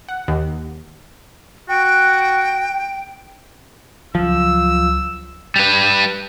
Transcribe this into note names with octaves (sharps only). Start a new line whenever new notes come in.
F#5
D#2
F#4 G5
C#2 F3 F#3 E6
G3 B4